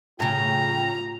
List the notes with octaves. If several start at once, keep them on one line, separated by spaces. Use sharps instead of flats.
A2 C#3 F4 G5 A#5